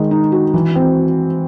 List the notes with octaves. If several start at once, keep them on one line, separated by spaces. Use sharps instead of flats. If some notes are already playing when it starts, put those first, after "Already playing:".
Already playing: D#3 G#3
D#4
F#4
E3
C4